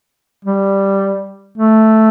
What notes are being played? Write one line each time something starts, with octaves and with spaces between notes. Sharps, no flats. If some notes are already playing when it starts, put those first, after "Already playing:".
G3
A3